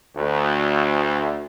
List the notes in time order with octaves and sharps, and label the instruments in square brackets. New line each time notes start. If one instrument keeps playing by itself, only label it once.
[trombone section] D2